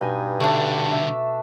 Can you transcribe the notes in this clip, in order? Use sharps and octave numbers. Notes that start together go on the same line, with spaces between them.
G2 B2 D#4 G#5
C2 D3 A3 D4
E5